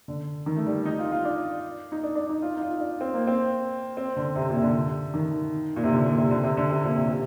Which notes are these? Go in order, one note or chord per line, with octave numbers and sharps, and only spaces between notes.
D3
D#3
A3
G3
D#4
F4
F4
D4
D#4
D4
D4
D#4
F4
D#4
F4
D4
C4
A#3
C4
C4
D3
C3
A#2
C3
D3
D#3
A#2
C3
D3
A#2
C3
D3
C3
D3
C3
A#2
C3
C3